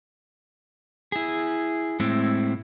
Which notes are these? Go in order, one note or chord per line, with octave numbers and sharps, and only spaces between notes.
E4 G#4
A2 G#3 C4 E4